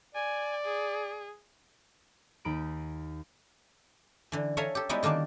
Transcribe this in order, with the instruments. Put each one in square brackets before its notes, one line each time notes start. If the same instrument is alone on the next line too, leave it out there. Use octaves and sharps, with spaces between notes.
[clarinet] D5 [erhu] G#5
[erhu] G#4
[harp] D#2 D#4 B5 D7
[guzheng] D3 E3
A4 C#5 E5 F5 G#5 A#5
G4 A4
G3 G#3 B3 D#4 E4 F#4
D3 D#3 A#3 D4 D5